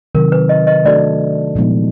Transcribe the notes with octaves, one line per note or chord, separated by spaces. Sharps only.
C3 D#3 F#3 A#4
B4
D#5
D#5
A3 D4 F#4 A4 D5
A#2 F3 G#3 B3 D#4